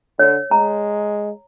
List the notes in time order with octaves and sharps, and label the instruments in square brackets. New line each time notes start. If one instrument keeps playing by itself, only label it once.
[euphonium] D3 [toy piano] C#5
[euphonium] G#3 [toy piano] A#5